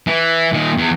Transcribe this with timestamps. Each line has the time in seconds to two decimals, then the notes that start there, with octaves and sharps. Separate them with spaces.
0.07 E3
0.53 A#2 D#3
0.77 E2